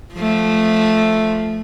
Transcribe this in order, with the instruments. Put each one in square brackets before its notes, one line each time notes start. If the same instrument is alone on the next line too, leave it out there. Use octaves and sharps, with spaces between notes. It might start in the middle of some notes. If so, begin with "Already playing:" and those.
[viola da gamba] F3 A3